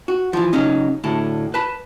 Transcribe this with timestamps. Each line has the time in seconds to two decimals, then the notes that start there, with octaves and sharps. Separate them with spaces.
0.08 F#4
0.33 E3 F3
0.53 C#3 F#3 C#4 D#4
1.04 D2 A2 A5
1.54 B4 A5 B5